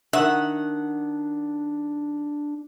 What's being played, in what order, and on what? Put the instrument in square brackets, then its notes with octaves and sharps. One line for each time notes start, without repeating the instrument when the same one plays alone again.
[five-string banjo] D#3 E5 [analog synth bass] D4 [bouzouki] F#5